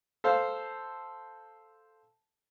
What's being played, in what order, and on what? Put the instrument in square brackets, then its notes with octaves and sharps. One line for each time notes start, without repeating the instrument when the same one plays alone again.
[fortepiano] A4 C5 F5